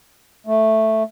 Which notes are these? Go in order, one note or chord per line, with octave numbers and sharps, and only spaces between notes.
A3